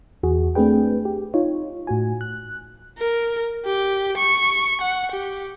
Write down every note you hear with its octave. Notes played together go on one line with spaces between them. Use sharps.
E2 F#4 G#4
A3 C4 D4 G#4 B4 G5
G4
D#4 F4 C#5
A2 F#4 G#5
F#6
A#4
G4
C#6
F#5
G4